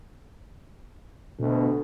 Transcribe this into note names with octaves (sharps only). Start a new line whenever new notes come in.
D2 B2